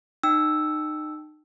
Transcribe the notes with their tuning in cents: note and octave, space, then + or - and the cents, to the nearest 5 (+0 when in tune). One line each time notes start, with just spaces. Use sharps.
D#4 -30 G5 +0 E6 +0